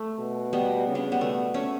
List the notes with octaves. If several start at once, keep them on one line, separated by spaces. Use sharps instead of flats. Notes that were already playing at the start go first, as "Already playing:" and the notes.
Already playing: A3
B2
G3 B3
C#3
B3 D4
G3 B3
B2 A3
A3 C#4